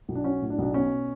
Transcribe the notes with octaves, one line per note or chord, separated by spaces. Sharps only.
B1
D4
F#3 C#4
A2
D4
B1
D4
B2 C#4